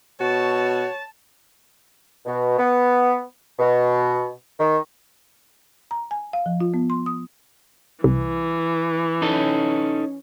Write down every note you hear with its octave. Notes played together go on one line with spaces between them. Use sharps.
B2 F#4 C#5 A5
B2
B3
B2
D#3
A#5
G#5
F5
F3
F4
B3
C6
D#6
C2 E3
C#4 D#4 A4